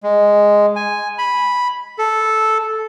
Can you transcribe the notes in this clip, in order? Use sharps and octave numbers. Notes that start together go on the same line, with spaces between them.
G#3
G#5
B5
A4